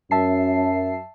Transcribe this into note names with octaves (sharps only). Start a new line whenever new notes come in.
F#2 E5 A5 C7